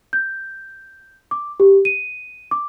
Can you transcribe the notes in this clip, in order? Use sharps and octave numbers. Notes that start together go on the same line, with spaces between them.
G6
D6
G4
D#7
D6